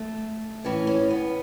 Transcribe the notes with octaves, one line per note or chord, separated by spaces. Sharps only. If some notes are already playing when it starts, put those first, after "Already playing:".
Already playing: A3
A2 E3 C#4
C#4
B3